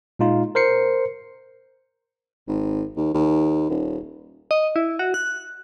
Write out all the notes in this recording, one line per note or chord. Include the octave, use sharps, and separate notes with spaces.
A#2 G#3 D#4 F4
A#4 C5 C7 C#7
G#1
D#2
D#2
D#1
D#5
E4
F#4
F#6